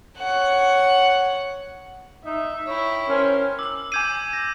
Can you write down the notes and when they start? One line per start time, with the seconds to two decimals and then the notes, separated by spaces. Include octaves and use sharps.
0.18 C#5 F#5
2.25 D#4 E5
2.67 E4 C#5 G5
3.09 C#4 A#4 C5 C6
3.59 D6 E6 F#7
3.92 G#5 D6 G6 G#6 C7 D#7
4.33 A#6